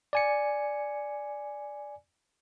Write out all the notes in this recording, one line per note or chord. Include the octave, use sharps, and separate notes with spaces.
D5 G#5 C#7